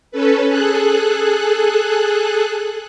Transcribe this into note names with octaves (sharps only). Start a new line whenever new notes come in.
C#4 A4 B4
G#4 A4 F#6